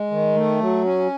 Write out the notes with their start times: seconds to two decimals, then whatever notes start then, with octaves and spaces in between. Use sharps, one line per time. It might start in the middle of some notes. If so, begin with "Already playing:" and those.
Already playing: G#3
0.11 D#3
0.36 A3
0.61 F#3
0.84 C#4